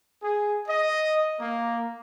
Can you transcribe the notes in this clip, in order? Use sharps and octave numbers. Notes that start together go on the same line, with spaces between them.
G#4
D#5
A#3